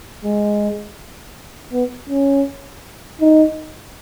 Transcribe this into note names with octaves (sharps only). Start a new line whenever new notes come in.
G#3
B3
C#4
D#4